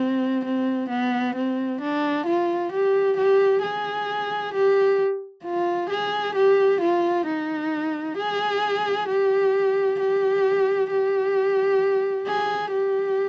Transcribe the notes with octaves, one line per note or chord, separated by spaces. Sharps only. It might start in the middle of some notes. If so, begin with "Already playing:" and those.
Already playing: C4
C4
B3
C4
D4
F4
G4
G4
G#4
G4
F4
G#4
G4
F4
D#4
G#4
G4
G4
G4
G#4
G4